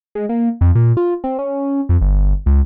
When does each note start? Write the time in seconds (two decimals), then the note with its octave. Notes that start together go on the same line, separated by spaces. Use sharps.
0.15 G#3
0.29 A#3
0.61 F2
0.75 A#2
0.97 F4
1.24 C4
1.39 C#4
1.89 F2
2.01 G1
2.46 C#2